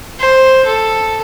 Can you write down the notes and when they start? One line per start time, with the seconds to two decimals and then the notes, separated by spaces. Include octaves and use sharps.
0.19 C5
0.65 A4